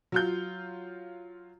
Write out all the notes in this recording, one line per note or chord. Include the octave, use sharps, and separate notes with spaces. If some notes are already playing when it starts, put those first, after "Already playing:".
F#3 F4 G6